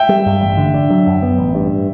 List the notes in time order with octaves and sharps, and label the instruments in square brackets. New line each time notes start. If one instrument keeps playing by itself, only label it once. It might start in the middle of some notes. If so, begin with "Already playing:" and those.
Already playing: [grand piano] E5 G5
[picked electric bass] G3
G2
A1
D3
D4
F#3
F#2
B3
A1
G2